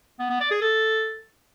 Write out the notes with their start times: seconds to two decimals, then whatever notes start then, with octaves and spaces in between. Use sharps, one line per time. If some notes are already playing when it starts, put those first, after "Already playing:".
0.19 B3
0.30 B3
0.40 D5
0.51 G#4
0.61 A4